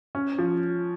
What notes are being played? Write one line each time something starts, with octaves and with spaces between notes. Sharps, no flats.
C#4
F3